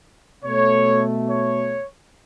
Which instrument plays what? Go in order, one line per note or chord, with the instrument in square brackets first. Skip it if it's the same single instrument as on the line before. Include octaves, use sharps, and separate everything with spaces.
[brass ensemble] B2 A3 C#5
C#5